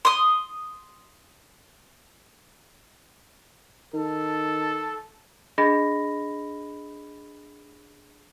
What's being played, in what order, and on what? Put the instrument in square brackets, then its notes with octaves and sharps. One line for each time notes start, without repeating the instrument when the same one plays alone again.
[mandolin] C6 D#6
[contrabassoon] D#3 [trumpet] A4
[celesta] D4 G#4 D#5 B5 A#6